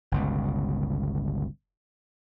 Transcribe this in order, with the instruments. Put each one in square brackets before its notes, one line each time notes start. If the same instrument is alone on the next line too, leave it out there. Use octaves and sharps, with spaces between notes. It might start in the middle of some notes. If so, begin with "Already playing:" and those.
[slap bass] G1 C#2 B2